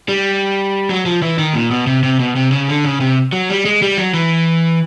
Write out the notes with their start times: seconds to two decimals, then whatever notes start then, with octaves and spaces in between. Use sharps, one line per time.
0.08 G3
0.90 F#3
1.06 F3
1.22 E3
1.39 D#3
1.55 A#2
1.71 B2
1.87 C3
2.03 C3
2.20 B2
2.36 C3
2.52 C#3
2.68 D3
2.85 C#3
3.01 C3
3.32 F#3
3.49 G3
3.65 G#3
3.82 G3
3.98 F#3
4.14 E3